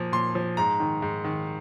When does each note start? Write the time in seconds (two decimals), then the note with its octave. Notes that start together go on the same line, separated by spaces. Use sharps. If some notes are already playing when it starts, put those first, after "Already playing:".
Already playing: A#2 F3
0.12 A#2 C6
0.35 F3
0.57 G#2 A#5
0.80 D#3
1.02 G#2
1.24 D#3